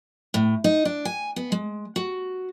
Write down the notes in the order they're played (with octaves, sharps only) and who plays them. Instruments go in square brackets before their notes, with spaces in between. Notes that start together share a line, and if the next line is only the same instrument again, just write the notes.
[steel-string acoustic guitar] A2
D#4
D4
G#5
B3
G#3
F#4